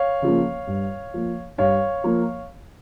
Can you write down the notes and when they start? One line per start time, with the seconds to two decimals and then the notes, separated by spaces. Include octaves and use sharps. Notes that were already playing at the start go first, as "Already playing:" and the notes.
Already playing: C#5 F5
0.22 C#3 F3 A#3
0.67 G2
1.14 F3 A#3
1.58 G2 C#5 F5
2.04 F3 A#3